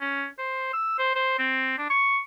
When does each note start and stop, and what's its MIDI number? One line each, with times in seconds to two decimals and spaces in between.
0.01 0.26 61
0.39 0.69 72
0.73 0.94 88
0.99 1.15 72
1.16 1.35 72
1.39 1.77 60
1.79 1.86 62
1.90 2.20 85